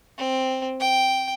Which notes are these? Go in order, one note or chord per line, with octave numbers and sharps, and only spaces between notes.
C4
G5